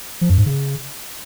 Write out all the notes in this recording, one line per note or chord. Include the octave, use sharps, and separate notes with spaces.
F3
F#2
G#2
C#3